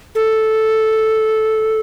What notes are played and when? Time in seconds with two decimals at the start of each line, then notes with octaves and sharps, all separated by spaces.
0.15 A4